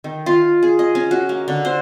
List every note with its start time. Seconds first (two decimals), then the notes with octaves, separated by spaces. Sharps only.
0.04 D#3
0.26 F4
0.63 G#4
0.79 D#5
0.95 C#4
1.11 F#4
1.29 A#3
1.48 D3
1.65 C5